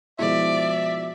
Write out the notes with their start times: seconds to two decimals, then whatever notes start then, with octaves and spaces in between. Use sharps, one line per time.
0.19 B2 F3 G#3 E4 D5 E5